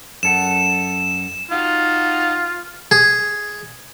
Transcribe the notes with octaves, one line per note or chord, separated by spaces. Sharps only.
F#2 A4 F#5 E7
D#4 F4 F#4 F5
G#4